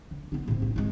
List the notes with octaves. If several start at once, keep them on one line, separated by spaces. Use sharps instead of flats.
D2
B3 D#4
A2 C3
G2
G#1 G#3